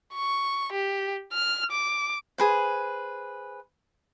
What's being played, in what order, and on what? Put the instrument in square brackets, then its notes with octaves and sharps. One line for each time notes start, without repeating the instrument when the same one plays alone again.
[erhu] C#6
G4
F6
D6
[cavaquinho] G#4 B4 C5